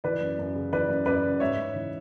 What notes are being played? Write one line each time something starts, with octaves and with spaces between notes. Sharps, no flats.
E3 B4 D5
F#2
F#2
C#3
E3 B4 D5
F#2
F#2 B4 D5
C#3
G#2 C#5 E5
G#2
E3